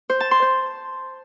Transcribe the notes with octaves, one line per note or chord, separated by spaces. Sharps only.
C5
A5
C6
C5